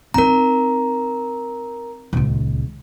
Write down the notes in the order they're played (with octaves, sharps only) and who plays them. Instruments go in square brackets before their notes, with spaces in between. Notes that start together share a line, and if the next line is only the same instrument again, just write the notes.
[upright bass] C4 D#4 [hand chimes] A#4 A#5
[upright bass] D#1 C#2